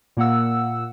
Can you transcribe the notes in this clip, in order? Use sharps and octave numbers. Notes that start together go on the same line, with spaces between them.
A#2 A#3 F#5 E6